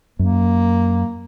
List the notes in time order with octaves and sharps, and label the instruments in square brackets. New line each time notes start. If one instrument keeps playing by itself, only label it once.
[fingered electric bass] F#2 [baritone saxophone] A#3